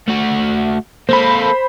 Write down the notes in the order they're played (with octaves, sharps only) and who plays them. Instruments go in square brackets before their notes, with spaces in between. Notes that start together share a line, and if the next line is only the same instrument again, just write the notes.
[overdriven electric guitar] A3 F#4
[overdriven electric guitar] A#3 A4 [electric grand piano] C5 B5